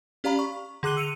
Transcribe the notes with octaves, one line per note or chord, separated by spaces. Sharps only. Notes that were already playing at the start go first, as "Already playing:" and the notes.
C#4 G4 D5 F5 A#5 B5
C#6
D3 G#4 D6 F#6 D#7 G7
E6 C#7 D#7 F7